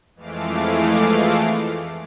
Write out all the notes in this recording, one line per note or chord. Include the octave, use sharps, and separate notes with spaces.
F2 E3 G#3 A3 F5 D6